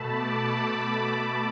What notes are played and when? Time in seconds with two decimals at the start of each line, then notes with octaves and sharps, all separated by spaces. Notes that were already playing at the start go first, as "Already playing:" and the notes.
Already playing: B2 A3 A5 B5
0.18 D6